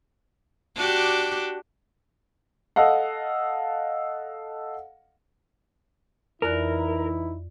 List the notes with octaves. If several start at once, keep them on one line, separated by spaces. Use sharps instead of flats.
D4 F#4 G4
A4 D#5 F5 F#5
F2 E3 D#4 E4 A#4 D5 F#6